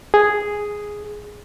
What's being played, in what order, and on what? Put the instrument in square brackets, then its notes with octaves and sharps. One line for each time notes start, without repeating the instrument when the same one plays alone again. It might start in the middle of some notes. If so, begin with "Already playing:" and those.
[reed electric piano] G#4